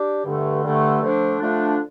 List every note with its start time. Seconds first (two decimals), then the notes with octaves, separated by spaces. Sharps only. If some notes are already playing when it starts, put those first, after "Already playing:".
Already playing: D4 G4
0.25 G2 D3 A3
0.63 G2 D3 A3
1.02 D3 F3 A3 D4
1.40 D3 F3 A3 D4